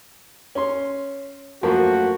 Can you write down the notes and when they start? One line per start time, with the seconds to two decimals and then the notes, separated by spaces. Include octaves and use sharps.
0.55 C#4 C6
1.63 F#2 F3 A3 A#3 F#4